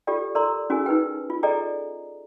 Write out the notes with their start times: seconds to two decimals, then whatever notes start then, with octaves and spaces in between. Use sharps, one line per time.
0.07 F4 G4 A4 D5 G5
0.35 A4 A#4 D5 A#5 C6
0.70 C#4 F#4 G#4 A#4 G#5
0.86 D#4 A#4 B4 G5
1.30 F4
1.43 G#4 A4 D5 D#5 G5 A#5